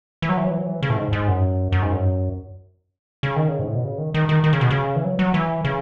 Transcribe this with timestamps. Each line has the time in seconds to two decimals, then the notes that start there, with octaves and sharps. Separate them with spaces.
0.22 E3
0.29 F#3
0.37 E3
0.44 F#3
0.51 E3
0.58 F#3
0.66 E3
0.83 C#3
0.90 A2
0.97 G#2
1.13 G#2
1.28 F#2
1.72 F#2
1.82 G#2
1.92 F#2
3.23 C#3
3.36 D#3
3.48 C#3
3.59 G#2
3.67 A2
3.76 B2
3.84 C#3
3.98 D#3
4.14 D#3
4.29 D#3
4.44 D#3
4.53 C#3
4.61 B2
4.71 C#3
4.96 E3
5.04 F#3
5.19 F#3
5.34 E3
5.64 C#3